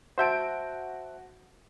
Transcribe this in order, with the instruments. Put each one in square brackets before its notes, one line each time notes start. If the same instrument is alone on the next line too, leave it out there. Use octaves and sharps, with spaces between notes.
[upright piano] F#4 G6 D7 [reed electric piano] C5 E5 A5